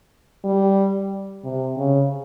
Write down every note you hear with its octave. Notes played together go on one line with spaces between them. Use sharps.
G3
C3
C#3